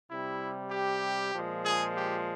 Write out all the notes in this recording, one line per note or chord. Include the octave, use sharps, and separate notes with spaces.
C3 G3 E4
G4
A#2 F3 G#3
G#4
G4